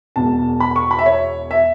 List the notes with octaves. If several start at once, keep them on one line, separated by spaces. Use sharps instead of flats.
E1 E2 B2 A5
B5
C#6
B5
E5
C#5
E5